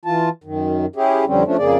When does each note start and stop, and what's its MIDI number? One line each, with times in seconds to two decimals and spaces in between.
0.05 0.29 52
0.05 0.29 65
0.05 0.29 81
0.44 0.86 42
0.44 0.86 51
0.96 1.25 61
0.96 1.25 64
0.96 1.25 67
0.96 1.25 68
1.27 1.43 41
1.27 1.43 50
1.27 1.43 55
1.27 1.43 60
1.27 1.43 61
1.45 1.57 53
1.45 1.57 57
1.45 1.57 61
1.45 1.57 62
1.58 1.78 41
1.58 1.78 49
1.58 1.78 58
1.58 1.78 68
1.58 1.78 74